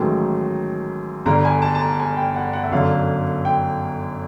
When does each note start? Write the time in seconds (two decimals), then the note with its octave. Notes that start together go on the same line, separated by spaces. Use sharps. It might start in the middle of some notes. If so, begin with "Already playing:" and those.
Already playing: A1 G#2 D#3 F#3 A3
1.26 G1 G2 D3 G3 A#5
1.45 G#5
1.62 A5
1.75 A5
1.80 A#5
2.00 G#5
2.17 G5
2.36 F#5
2.53 F#5
2.63 E5
2.72 G1 F#2 D3 F5
3.45 G5